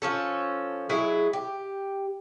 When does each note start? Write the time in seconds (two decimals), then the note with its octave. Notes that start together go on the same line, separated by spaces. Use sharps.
0.02 F3 C#4 A4
0.89 F#3 G#3 E4 G#4
1.33 G4